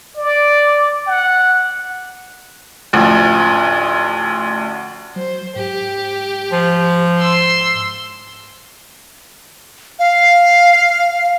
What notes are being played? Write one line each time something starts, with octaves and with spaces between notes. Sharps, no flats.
D5
F#5
A1 D2 F3
F#3 C5
G#2 G4
F3
C6 E6
F5